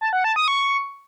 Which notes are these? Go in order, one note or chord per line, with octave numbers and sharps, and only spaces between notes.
A5
F#5
A5
D#6
C#6